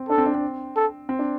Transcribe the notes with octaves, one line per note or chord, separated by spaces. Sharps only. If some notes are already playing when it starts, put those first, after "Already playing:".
Already playing: C4
D4 A4
C4
D4
C4
A4
C4
D4